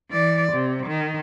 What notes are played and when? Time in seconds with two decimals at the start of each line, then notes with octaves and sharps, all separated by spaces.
0.11 E3 D5
0.53 C3
0.87 D#3